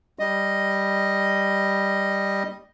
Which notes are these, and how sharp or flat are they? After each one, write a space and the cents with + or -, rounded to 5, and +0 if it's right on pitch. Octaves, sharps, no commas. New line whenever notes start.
G3 +0 D#5 +0